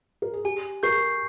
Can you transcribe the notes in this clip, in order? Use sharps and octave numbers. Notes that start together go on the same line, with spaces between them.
A#4
G#4
G4 G#5
A#4 C#6 G6 C7